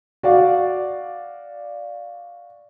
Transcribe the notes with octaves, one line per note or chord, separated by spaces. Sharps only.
F#4 D5 F5